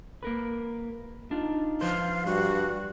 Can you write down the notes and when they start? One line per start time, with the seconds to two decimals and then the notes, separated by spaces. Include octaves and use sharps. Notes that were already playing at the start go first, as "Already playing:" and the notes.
0.23 A#3 A#4 B4
1.31 D4 D#4 F4
1.81 F3 B4 C5 F5
2.26 G2 F#4